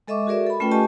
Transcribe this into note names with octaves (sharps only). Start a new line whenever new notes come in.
G#3 A4 D#5 E5 C#6 D6
F#4 G#4 A#4 D5 E5
A4 B5
A3 C#4 F4 B4 G5
G4 D#5 G#5 A5 C#6